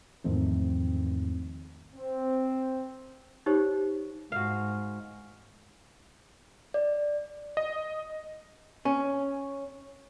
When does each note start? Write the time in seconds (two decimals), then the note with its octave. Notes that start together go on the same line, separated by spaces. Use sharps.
0.24 E2 G#2 D#3 F3 A3 C4
1.96 C4
3.46 D#4 G4 C5 C#5
4.32 G#2 F#4 F5
6.74 D5
7.57 D#5
8.85 C#4